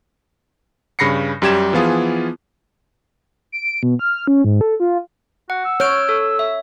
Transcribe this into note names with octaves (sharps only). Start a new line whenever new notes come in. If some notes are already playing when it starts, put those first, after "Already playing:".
G2 C#3 B5 A#6 C7 C#7
F#2 G3 G4 G#6 E7
E3 F3 B3 F4 G#4
D7
B2
F6
C#4
G#2
A4
F4
F#4 F#5
E6
C#5 F6 G6 D7
A4
E5